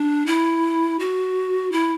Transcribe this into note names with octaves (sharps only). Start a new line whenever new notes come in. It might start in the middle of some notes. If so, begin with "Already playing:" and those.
Already playing: D4
E4
F#4
E4